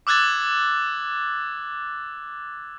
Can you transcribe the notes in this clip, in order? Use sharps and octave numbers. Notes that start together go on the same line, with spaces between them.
D6 E6 F#6 G#6 A6